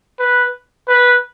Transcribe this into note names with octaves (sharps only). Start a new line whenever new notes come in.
B4
B4